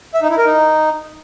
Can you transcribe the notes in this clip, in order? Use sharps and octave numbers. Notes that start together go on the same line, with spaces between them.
E5
D#4
E4
A#4
D#4